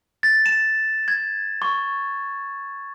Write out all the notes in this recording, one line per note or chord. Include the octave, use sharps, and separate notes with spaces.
A6
E7
G#6
C#6